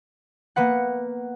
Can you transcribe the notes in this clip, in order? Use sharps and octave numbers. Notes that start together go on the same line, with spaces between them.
A#3 B3 B4 F#5